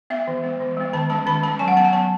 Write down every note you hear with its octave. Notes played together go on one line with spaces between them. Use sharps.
B3 E5
E3
G#3 B3
E3
G#3 B3
D#3 A5
G#3 C#4 A5
D#3 B5
G#3 C#4 A5
F#3 G#5
F#5
B3 A5
G#5
F#3 A5